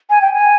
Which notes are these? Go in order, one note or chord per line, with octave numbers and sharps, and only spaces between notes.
G#5
G5
G#5